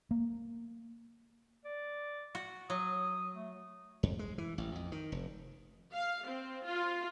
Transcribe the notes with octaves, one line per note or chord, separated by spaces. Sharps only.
A#3
D5
F#4
F#3 D#6
A3
F2
G#3
E3
A1
F2
D#3
F1
F5
C4
F4